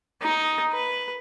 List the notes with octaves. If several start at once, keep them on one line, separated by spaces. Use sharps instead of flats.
D#4
B4